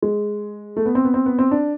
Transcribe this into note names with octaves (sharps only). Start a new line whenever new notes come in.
G#3
A3
B3
C4
B3
C4
B3
C4
D4